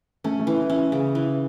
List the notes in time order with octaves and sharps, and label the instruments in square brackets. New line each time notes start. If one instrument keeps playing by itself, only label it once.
[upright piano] A3 [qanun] C#4
[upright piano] A3
[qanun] E3
[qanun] C#4 [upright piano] E4
[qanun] C#3
E3